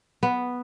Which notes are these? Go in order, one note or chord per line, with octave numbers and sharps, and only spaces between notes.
B3